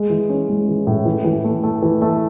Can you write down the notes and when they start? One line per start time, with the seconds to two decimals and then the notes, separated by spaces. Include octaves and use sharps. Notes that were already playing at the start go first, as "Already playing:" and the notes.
Already playing: G#3
0.10 E3
0.29 C#4
0.49 G#3
0.68 E3
0.87 A2
1.05 E3
1.25 E3
1.44 A3
1.63 A3
1.82 E3
2.02 A3